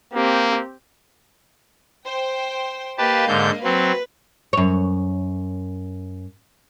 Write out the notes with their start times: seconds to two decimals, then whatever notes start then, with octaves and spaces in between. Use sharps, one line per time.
0.13 A#3 C4 G4
2.05 C5 G5
2.98 A#3 G4 B4 D#5 F5 A5
3.28 G#2 D3 G6
3.64 F#3 C4 B4
4.53 F#2 C#5